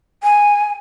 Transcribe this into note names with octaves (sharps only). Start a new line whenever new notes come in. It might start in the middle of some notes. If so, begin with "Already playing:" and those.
G#5